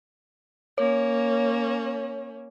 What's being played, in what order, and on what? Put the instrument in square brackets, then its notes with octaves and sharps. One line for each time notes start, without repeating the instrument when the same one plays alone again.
[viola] A#3 C#4 [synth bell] C#5